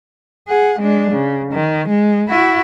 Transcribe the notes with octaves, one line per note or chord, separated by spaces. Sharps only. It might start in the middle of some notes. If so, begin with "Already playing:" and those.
G#4 F#5
G#3 D4
C#3
D#3
G#3
E4 F#4